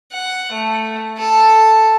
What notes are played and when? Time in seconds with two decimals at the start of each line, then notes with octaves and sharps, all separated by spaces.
0.13 F#5
0.53 A3
1.18 A4